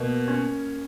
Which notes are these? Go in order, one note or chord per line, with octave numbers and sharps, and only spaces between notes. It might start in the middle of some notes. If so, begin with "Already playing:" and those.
Already playing: B2 A#3
C#4